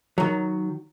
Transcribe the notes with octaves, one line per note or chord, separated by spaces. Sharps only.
D#3 F#3